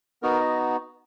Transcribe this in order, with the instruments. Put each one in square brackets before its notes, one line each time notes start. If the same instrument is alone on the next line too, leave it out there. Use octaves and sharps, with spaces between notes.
[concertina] B3 D#4 F#4 A#4
D#5